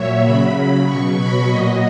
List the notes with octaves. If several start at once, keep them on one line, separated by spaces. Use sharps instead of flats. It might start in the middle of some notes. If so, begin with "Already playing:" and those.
Already playing: A#2 F#3 C#5 E5
C#3 F#3 B5
B2 F#3 C#6
B5
A#2 F#3 D#5